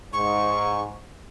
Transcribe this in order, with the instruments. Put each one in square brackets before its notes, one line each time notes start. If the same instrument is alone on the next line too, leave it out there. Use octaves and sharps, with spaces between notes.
[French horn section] G#2 [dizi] C#6